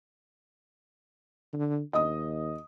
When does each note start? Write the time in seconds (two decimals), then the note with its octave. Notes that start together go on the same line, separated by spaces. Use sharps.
1.53 D3
1.93 D#2 D#5 D#6